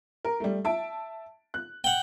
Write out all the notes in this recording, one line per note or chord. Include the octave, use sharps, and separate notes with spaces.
A#4
G3 A3
E5 A5 D7
F#6
F#5 G5